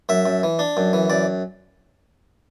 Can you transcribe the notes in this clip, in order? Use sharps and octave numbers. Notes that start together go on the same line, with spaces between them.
F#2 E5
F#2
E3
D4
F#2
E3
F#2 D5